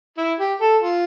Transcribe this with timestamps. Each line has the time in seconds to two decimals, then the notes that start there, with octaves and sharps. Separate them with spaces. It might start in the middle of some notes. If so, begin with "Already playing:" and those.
0.17 E4
0.39 G4
0.61 A4
0.82 F4